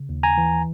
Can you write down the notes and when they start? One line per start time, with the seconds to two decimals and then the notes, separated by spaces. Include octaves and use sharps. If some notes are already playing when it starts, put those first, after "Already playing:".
Already playing: C#3
0.09 D#2
0.23 G#5 A#5
0.37 E3